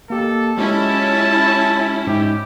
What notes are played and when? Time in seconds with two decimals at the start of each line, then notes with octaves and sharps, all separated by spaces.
0.10 A#3 G4 A4
0.57 G#3 C#4 E4 F4 G4 A5
2.07 G#2 G4